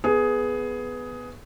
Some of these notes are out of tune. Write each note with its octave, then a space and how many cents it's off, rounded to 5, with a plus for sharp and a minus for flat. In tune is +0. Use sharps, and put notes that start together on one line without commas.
B3 +5 G#4 +10